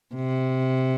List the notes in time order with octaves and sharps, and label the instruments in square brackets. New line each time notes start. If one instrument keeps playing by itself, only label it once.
[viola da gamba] C3